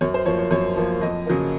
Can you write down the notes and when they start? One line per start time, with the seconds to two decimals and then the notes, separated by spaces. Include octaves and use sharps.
0.01 F#2 C#5
0.14 C5
0.26 F3 A#3 C#5
0.39 C#5
0.51 F#2 C#5
0.76 F3 A#3
1.01 F2 D#5
1.26 C#3 F#3 A#3